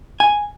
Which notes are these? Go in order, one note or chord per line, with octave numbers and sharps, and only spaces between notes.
G#5